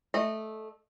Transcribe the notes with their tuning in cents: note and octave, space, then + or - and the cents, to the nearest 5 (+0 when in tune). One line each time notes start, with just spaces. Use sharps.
A3 -10 D#5 -20